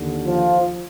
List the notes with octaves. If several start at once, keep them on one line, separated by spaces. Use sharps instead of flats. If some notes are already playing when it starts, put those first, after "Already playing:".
Already playing: D#2 D3
F3 F4